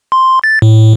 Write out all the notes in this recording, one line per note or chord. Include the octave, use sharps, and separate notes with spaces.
C6
A6
A2